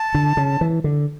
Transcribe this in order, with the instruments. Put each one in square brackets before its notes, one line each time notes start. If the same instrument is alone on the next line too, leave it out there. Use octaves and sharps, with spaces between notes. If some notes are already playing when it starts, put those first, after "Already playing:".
Already playing: [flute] A5
[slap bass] D3
C#3
E3
D3